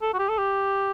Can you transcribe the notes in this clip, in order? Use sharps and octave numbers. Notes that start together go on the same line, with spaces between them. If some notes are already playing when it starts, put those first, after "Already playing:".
A4
F#4
G4
A4
G4